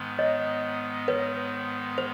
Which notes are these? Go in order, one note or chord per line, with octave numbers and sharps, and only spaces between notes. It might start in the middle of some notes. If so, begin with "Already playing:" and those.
Already playing: G#2 D#3 G#3 B3
C#5 D#5
B4 C#5
C5